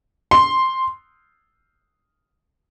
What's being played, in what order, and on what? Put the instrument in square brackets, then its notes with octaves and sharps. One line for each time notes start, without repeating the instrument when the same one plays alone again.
[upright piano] C6